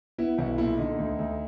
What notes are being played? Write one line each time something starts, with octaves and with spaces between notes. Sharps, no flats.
B3 E4
B1 E4
A#2 E4
D3 D#4
D2
D2